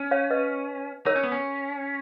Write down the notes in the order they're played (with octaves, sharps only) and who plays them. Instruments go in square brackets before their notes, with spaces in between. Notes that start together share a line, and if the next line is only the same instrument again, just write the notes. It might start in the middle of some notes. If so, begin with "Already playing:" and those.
Already playing: [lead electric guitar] C#4
[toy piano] C#5 F5
B4 D#5
[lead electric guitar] D#4 [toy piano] A#4 C#5
[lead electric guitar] C#4
B3
C#4